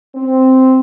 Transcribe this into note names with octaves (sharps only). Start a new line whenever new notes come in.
C4